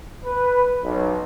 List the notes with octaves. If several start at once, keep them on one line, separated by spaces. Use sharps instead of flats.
B4
B1